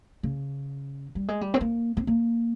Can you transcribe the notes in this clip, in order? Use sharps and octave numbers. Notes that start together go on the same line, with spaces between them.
C#3
G3
G#3
G3
C4
A#3
C4
A#3